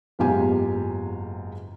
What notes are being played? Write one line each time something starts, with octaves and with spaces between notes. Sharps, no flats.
F#1 E2 G#2 F4 G4 G#5